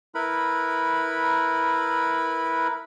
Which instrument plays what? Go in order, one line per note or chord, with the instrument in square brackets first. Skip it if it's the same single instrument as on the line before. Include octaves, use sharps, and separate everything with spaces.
[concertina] E4 A#4 B4 B5